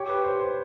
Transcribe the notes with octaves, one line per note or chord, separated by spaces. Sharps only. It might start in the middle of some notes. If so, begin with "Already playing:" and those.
Already playing: G4 C#5
B4
C5
C5